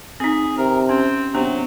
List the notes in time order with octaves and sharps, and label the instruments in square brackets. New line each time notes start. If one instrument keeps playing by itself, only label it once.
[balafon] C4 D#4 [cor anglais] G#4
[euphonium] C3 [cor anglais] A#4
[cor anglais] C4 [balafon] C#4
[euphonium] C3 [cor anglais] F#3 [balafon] B3 D4 G4